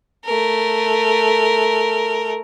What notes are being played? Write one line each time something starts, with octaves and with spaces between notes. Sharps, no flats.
A3 A#4